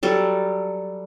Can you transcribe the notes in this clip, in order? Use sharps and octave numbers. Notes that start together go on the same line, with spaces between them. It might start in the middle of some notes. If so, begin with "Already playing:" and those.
F#3 G3 A4